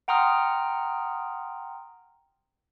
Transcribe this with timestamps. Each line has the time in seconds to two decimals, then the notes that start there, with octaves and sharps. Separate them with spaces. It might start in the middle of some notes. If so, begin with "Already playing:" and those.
0.08 F#5 G5 A#5 C6 D#6 F6